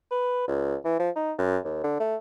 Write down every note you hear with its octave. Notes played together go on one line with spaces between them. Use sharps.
B4
C#2
E3
F3
D#4
F#2
D#2
D3
A3